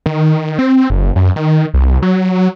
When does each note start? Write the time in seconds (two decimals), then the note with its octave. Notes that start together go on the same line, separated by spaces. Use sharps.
0.06 D#3
0.59 C4
0.90 F#1
1.16 F#2
1.36 D#3
1.74 C2
2.02 F#3